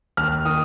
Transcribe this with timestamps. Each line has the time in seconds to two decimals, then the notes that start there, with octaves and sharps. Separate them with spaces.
0.17 D#2 F6
0.45 D#3 D#6